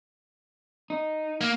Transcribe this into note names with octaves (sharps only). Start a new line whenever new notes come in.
D#4
A#3